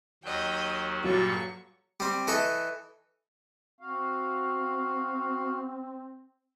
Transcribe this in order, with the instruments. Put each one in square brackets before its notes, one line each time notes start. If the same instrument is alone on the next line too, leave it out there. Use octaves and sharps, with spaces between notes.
[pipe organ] D#2 F#3 [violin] D#5 G5
[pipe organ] G2 A#2 A4 [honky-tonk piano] F#3 [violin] C#6
[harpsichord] G3 C4
E3 A4 D#5 C#6
[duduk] C4 [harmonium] F#4 F5